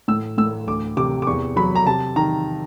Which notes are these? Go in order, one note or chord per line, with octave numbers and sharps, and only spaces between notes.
A2 E6
A2 E6
D2 D6
C3 D6
D6
E2 C#6
F#3 B5
A#5
C3 A5
D#3 A#5